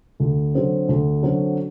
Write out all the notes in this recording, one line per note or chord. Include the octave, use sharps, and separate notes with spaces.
D2
D3 F#3 C4
D2
D3 F#3 C4